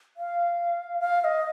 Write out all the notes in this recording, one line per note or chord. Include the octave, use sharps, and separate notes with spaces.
F5
F5
F5
D#5